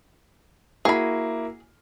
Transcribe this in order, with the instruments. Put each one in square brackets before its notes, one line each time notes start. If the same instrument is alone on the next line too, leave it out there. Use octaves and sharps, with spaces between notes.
[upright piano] A#3 E4 F#4 [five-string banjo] G#4 B5